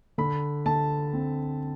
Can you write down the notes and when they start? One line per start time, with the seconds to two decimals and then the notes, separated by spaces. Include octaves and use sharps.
0.18 D3 B5
0.66 D3 A5
1.13 C4